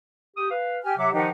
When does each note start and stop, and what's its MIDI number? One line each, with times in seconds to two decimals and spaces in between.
0.37 0.48 67
0.37 0.48 87
0.51 0.79 71
0.51 0.79 77
0.83 0.97 67
0.83 0.97 80
0.83 0.97 89
0.98 1.12 48
0.98 1.12 54
0.98 1.09 76
0.98 1.09 78
0.98 1.09 86
1.13 1.29 51
1.13 1.29 53
1.13 1.28 63
1.13 1.28 67
1.13 1.28 78